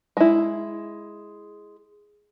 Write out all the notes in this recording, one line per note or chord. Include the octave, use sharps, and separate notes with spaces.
G#3 E4